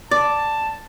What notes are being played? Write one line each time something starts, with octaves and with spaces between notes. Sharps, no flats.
D5 A5